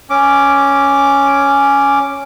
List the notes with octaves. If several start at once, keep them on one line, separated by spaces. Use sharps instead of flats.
C#4 D6